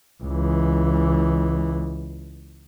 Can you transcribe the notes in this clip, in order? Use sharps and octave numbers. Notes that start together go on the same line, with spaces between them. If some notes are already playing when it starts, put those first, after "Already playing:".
C#2 E3